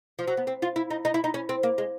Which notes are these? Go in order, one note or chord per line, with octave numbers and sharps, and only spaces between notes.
F3
F#3
B3
C4
F4
E4
D#4
D#4
E4
D#4
C#4
C4
A#3
G#3